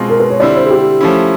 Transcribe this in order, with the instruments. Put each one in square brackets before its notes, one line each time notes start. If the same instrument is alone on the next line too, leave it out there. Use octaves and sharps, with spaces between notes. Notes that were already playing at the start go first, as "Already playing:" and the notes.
Already playing: [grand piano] B2 G#3 C4 F4
[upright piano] A#4
B4
C#5
[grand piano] D3 G3 C4 E4 [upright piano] D5
[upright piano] C5
G#4
G4
[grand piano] F3 A3 C#4 E4